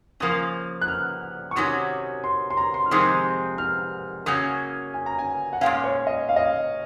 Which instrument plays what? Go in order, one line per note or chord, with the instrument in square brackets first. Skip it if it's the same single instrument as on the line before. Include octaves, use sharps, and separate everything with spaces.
[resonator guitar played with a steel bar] C#3 F3 A#3 [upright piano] D#6
[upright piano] F#6
F6
C#6
[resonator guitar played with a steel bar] C3 D#3 F#3 C#4 [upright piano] D#6
[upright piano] C6
C6
A#5
C6
F6
[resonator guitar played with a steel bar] F2 C3 D#3 G#3 C4 [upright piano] D#6
[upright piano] F6
[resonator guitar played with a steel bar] C#3 F#3 A#3 C#4 [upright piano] D#6
[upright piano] G#5
A#5
G#5
F#5
[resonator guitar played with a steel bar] A#2 G#3 C#4 [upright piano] F5
[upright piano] C#5
D#5
F5
D#5
F5